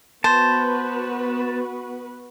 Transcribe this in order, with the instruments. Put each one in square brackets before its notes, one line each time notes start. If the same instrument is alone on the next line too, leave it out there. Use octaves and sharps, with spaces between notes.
[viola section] B3 F#4 B4 [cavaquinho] C5 [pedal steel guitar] A5